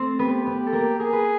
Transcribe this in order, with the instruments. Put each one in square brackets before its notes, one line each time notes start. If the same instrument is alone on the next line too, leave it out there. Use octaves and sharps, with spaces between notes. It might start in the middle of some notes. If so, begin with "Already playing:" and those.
Already playing: [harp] A3 C4 A4 C5
[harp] B3 B4 [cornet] G4
[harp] B3 B4
[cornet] G4
[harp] A4
A#3 A#4
[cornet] G#4 [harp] A#4
[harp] B4